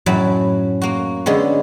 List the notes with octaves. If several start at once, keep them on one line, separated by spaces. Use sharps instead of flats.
F#2 A2 F#3 B5
A#3 F#4
D3 G#3 B3 C#4